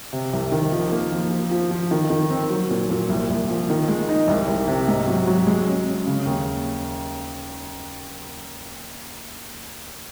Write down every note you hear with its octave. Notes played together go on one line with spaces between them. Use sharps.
C3
C2
D#3
F3
A#3
F3
F3
F3
F3
D#3
D#3
C4
F#3
A#2
A#2
C2
C2
F3
D#3
G#3
D#4
C2
C2
C3
G#2
F#3
F#3
G#3
C#4
C#4
C#3
D#2